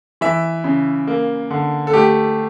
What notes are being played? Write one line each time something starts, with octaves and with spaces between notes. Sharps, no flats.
E3 E5
C#3
A#3
D3
A4
A3 G4